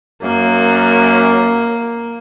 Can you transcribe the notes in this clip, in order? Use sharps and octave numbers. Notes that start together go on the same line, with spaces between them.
F#2 A#3